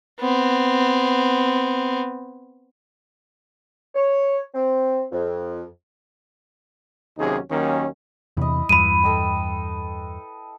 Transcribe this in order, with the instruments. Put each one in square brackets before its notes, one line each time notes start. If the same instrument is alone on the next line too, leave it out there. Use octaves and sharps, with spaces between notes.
[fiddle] B3 C4
[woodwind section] C#5
C4
F2
[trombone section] D#2 C3 F#3 C#4 D#4 G#4
D#2 D#3 F#3 A#3 C#4
[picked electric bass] E2 C3 [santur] E4 D#5
[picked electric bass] E2 G2 [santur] E4 B4 [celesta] B5 D#7
[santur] A4 D#5 G5